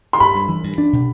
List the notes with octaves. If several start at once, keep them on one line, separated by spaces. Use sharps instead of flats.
C6
G2 B5
G2
E3
G2
D4
B2